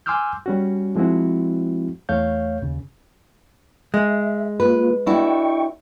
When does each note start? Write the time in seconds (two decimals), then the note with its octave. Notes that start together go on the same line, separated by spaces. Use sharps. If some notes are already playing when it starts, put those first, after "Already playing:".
0.06 G#5 C6 D6 E6 F6 G6
0.46 G3 C#4 F#4
0.96 F3 G#3 C4 E4 F#4
2.09 E2 A3 C#5 F5 G6
2.62 D#2 C#3
3.94 G#3 E5
4.60 A#3 F4 B4
5.06 D4 E4 F#4 D#5 G5 C#6